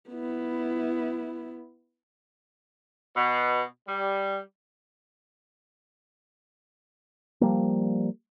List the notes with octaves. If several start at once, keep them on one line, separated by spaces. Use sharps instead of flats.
B3 E4
B2
G3
F3 G3 A#3